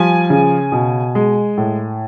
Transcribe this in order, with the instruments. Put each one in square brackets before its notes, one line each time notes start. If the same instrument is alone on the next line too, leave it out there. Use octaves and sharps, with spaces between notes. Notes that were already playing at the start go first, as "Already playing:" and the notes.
Already playing: [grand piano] F3 G3 G#5
C#3
B2
G#3
A2